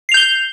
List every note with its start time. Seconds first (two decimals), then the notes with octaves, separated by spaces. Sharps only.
0.09 C7
0.12 F7
0.14 G6
0.17 G7